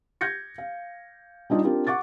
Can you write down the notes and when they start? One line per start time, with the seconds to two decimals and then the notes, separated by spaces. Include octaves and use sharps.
0.21 G6 G#6 A#6 C#7
0.58 F5
1.50 G3 D4 D#4 F4 G4
1.64 C4 D4 F4 G4 A#4
1.87 F#5 C#6 D6 A6